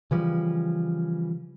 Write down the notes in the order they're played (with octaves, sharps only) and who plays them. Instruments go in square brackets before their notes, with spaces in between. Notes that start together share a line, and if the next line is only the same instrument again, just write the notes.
[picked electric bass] C#3 E3 F3 G3